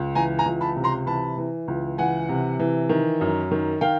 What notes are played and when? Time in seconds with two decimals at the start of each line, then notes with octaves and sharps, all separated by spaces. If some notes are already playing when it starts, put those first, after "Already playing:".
Already playing: C#2
0.15 E3 G#5 A#5
0.39 G#5 A#5
0.46 C#2
0.61 A5 B5
0.76 C3
0.84 A#5 C6
1.06 E3 A5 B5
1.38 E3
1.68 C#2
1.98 E3 F#5 G#5
2.29 C3
2.59 E3
2.89 D#3
3.21 F#2
3.51 D#3
3.81 D#3 F5 G5